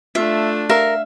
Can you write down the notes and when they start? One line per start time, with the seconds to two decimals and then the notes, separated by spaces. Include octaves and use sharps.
0.15 A3 D4 F4 E5
0.69 A#4 E5 F5